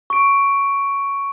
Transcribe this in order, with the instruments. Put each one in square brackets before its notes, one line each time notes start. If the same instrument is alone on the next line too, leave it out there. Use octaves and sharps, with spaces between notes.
[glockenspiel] C#6 D7